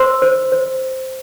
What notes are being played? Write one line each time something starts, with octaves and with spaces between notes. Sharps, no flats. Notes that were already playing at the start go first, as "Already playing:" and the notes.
Already playing: C5 C6 E6
C5
C5